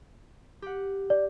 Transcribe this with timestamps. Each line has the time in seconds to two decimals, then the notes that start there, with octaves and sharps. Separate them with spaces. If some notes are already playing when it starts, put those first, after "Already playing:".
0.62 G4 F#5
1.10 D5